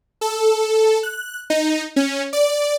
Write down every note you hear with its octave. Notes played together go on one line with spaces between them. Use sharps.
A4
F#6
D#4
C#4
D5